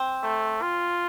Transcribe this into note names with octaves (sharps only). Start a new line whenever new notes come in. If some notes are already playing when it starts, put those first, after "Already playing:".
Already playing: C4
A3
F4